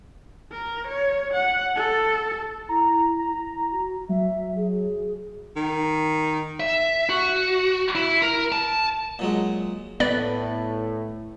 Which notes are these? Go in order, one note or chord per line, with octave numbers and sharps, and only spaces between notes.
A#4
C#5
F#5
A4
E4 A#5
A#5
F#4
F#3 E5
G#4
D#3
E5
F#4
E4
A#4
A5
A#2 F#3 G#3
A2 B3 B4 D5